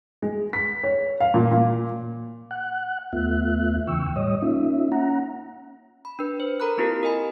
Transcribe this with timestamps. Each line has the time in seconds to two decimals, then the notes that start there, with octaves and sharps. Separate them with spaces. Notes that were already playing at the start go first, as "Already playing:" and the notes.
0.22 G#3
0.53 B6
0.83 C#5
1.20 F5
1.34 A#2
1.51 A#2
2.51 F#5 F#6
3.13 D#2 A3 B3 F4 E5 F#6
3.87 E2 C#3 E3 G5 C#6 E6
4.16 A2 G3 C#5 D#5 D#6
4.42 A#3 C#4 D#4 F4 E5
4.92 C#4 F#5 A#5
6.05 B5
6.19 D4 B4
6.40 C5
6.60 A4 A#4 A#5 B5 F#6
6.77 A#3 C4 E4 F4 G4 A#4
7.03 A#4 D#5 G#5 B5